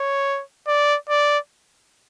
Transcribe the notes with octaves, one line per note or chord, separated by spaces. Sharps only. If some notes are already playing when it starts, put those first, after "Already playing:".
Already playing: C#5
D5
D5